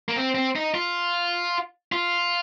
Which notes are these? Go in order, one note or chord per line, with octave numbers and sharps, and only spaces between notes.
A#3
C4
C4
D#4
F4
F4